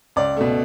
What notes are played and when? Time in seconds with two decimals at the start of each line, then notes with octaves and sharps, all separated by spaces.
0.16 C#2 D5
0.37 B2 A3